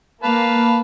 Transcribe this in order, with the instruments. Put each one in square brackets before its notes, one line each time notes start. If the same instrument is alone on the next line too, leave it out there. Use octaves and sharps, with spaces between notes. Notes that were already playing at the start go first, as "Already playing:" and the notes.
[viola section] A#3 [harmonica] B4 F5 A5